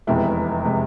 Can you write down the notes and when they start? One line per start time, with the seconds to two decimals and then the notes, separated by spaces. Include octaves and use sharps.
0.07 F1 E2 C3 G#3 E4
0.65 C3 G#3